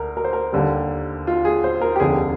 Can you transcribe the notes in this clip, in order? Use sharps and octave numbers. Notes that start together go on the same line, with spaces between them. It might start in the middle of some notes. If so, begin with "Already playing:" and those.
Already playing: D2 A#4
A#4
C5
A#4
D#2 D3 G3
F4
G#4
C5
A#4
G4
F1 D#2 D3 G#4